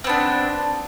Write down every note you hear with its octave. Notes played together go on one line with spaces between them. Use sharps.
B3 C4 D4